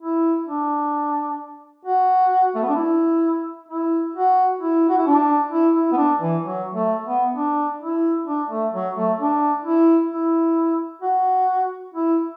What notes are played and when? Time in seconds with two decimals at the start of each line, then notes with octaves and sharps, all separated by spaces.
0.01 E4
0.48 D4
1.85 F#4
2.55 A3
2.63 B3
2.69 D4
2.76 E4
3.69 E4
4.15 F#4
4.61 E4
4.89 F#4
4.98 E4
5.06 D4
5.51 E4
5.75 E4
5.92 B3
5.97 D4
6.21 E3
6.44 F#3
6.74 A3
7.05 B3
7.35 D4
7.82 E4
8.27 D4
8.50 A3
8.73 F#3
8.96 A3
9.20 D4
9.64 E4
10.11 E4
11.02 F#4
11.95 E4